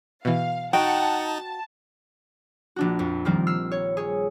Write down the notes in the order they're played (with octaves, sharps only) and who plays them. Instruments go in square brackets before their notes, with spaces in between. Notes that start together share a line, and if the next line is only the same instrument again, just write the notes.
[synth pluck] B2 E3 [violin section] F5
[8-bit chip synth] D#4 [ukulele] F#4 G5 [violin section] F#5 A5
[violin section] A5
[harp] A#1 D4 F#4
F2
D#3 F3 G3 C4 F4 A#4
E6 F6 C7
C#5
G#4 C#5